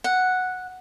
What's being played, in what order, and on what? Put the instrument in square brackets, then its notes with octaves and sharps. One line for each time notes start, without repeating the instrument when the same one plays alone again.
[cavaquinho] F#5